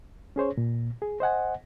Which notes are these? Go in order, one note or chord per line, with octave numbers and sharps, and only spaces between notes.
C#4 G#4 C5 C#5
A#2
G#4
C5 D#5 F#5 G#5